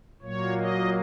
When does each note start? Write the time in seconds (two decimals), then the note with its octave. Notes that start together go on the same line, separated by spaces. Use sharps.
0.22 A#2 F#3 A#3 C#5
0.58 D#5